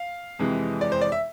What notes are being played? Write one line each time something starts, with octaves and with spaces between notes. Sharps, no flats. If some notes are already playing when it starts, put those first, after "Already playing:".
Already playing: F5
F2 C3 E3 G#3
D5
C5
D5
E5